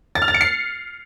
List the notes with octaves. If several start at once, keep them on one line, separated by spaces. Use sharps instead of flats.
A6
F6
A6
C#7
C7